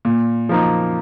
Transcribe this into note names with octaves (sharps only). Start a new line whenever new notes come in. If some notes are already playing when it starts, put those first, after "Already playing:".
A#2
F3 A#3 D#4